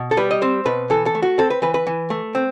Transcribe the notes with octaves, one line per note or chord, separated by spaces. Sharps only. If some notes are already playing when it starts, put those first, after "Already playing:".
Already playing: B2
A4
G3 B4
D#5
C4 C5
B2 B4
E3 A4
A4
A3
F#4
C4 A4
B4
E3 B4
B4
E3
A3
C4